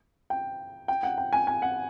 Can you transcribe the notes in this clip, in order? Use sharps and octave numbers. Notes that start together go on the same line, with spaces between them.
G5
G5
F#5
G5
G#5
G#5
F#5